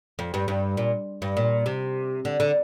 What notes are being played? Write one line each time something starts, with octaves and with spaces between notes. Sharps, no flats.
F2
G2
G2
A#2
G2
A#2
C3
D3
D3